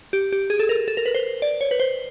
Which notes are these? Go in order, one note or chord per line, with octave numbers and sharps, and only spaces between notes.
G4
G4
G#4
A4
A#4
A4
A#4
B4
C5
D5
C#5
B4
C5